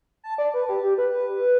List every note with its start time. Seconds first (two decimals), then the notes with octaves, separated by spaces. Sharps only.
0.24 A5
0.38 D5
0.54 B4
0.69 G4
0.83 G4
0.98 B4